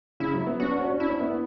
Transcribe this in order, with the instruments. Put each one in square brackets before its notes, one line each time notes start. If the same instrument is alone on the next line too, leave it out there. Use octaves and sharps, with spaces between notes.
[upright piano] C#3 [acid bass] E4
[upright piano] F#3
B3
[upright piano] C#4 [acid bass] F#4
[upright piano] D4
C#4
C#4
[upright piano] D4 [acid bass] E4
[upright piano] C#4
B3
B3